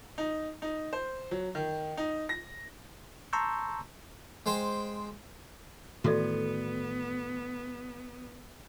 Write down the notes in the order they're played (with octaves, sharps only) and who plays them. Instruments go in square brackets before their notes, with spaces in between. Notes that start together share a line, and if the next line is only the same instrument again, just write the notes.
[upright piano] D#4
D#4
C5
F#3
D#3
D#4
A#6
[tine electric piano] A5 A#5 C6 C#6 E6 G6
[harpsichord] G#3 C5 G5
[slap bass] A2 D#3 E3 [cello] B3 [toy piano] F#4 A4 D5